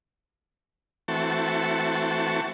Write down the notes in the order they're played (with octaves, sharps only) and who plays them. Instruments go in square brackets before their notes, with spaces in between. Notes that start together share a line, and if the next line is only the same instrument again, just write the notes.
[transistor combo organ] E3 A3 C4 F#4 A5 C#6